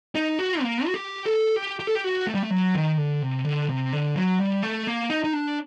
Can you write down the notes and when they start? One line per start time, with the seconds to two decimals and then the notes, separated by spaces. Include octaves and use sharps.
0.15 D#4
0.39 F#4
0.62 A#3
0.86 F#4
0.94 G4
1.25 A4
1.56 G4
1.80 G4
1.87 A4
1.95 G4
2.04 F#4
2.27 A3
2.34 G3
2.43 A3
2.50 F#3
2.75 D#3
2.97 D3
3.22 C3
3.45 D3
3.69 C3
3.93 D3
4.16 F#3
4.39 G3
4.63 A3
4.87 A#3
5.10 D#4
5.24 D#4
5.33 D4